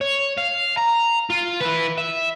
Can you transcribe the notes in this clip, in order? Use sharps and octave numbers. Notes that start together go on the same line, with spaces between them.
C#5
F5
A#5
F4
E4 B4
E5